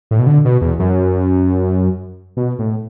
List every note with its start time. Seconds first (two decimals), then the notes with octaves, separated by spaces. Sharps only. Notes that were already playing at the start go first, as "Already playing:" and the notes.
0.11 A2
0.19 B2
0.27 D3
0.45 B2
0.61 E2
0.79 F#2
2.37 B2
2.59 A2